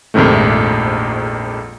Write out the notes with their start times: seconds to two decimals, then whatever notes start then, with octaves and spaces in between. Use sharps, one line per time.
0.14 A#1 F2 G#2 C3 D#3 A3